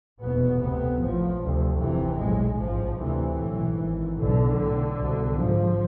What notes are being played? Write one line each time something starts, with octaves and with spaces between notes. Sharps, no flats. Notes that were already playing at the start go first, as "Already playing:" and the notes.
F1 E2 B2 B3
D2 C3 B3
A1 A2 F3
D2 C3
F1 F2 C3 E3
B1 A2 G#3
A1 G#2 F3
D2 C3 E3
B1 A2
G#1 G#2
B1 B2 D3
B1 A2
C2 B2
G#1 G#2 F3